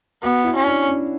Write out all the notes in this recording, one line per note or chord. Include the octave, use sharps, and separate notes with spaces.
B3 F#4
E4
C#4
D4
C#4